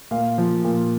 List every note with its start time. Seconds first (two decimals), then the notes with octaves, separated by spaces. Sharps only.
0.11 A#2 F5
0.38 F3
0.65 A#2